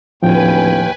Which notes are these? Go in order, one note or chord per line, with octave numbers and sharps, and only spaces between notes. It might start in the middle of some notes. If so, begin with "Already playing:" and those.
D1 D#2 A2 F3 B4 G5 G#5